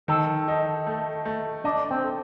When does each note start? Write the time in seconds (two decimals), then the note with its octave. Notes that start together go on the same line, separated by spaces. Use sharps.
0.08 D#3 A4
0.48 D#4
0.87 A3
1.25 A3
1.64 D4 D#5
1.91 C4
2.04 A4